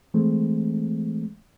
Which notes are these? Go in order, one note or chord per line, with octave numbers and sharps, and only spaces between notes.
E3 G#3 A3 C4